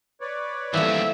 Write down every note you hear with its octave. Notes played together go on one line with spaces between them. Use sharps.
B4 C#5 D5
E3 F3 G3 A3 A#3 E5